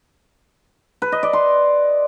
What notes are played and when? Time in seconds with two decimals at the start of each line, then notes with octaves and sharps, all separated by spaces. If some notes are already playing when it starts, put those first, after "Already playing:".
1.02 B4
1.12 D#5
1.23 D5
1.33 C6